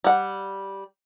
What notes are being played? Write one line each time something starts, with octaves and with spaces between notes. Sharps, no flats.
G3 F#5